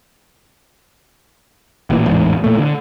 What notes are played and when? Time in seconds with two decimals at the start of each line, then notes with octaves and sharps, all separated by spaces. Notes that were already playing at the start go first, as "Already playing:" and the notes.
1.90 A1 A#2 E3
2.07 A1 E2 G#2
2.44 A#2 A3
2.58 D3